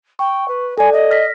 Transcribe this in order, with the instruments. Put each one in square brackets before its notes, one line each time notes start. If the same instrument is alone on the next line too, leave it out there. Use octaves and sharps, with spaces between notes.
[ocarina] G5 [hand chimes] C#6
[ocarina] B4
[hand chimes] A4 D5 [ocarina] G#5
[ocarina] D#5
[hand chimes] F6 A#6 B6